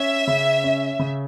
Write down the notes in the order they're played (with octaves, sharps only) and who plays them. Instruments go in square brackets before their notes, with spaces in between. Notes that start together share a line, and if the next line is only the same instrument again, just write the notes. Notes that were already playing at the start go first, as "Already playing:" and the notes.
Already playing: [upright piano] C#4 [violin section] E5
[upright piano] C#3
C#4
C#3